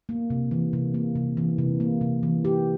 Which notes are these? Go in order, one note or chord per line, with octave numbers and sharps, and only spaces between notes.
A#3
C3
E3
C3
A#3
C3
E3
C3
A#3
C3
E3
G4